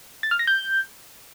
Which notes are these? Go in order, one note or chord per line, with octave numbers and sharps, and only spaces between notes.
A6
F6
A#6
G6